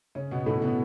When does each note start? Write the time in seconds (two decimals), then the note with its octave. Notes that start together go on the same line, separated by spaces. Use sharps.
0.15 C#3 C#4
0.31 B2 B3
0.46 A2 A3
0.62 B2 B3